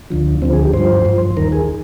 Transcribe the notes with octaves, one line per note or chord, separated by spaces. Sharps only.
D2 D3 F3
D2 D3 F3 C4
G#4
G4
G2 F3 C5
G2 F3
D#2 D#3 A#4
G#4